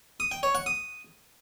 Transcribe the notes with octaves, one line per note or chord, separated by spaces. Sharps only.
D#6
G5
C#5
F#5
D#6